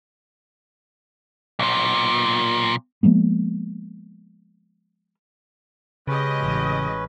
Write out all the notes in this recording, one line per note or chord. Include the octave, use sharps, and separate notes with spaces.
B1 A#2
F3 G#3 A#3 B3
C#3 G#3 C#4 G4 B4 D#5
A1